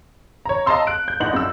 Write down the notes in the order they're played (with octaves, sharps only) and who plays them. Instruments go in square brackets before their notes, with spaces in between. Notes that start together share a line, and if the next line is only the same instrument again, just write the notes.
[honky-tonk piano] C#5 A#5
D#5 F5 A5 A#5 C6 E6
F#6 D7
G6
A#1 D#4 F#5 F#7
F#2 E6